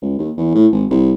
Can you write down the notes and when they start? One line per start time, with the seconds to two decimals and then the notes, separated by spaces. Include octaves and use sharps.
0.02 C#2
0.19 D#2
0.37 E2
0.55 A2
0.72 G#1
0.90 C2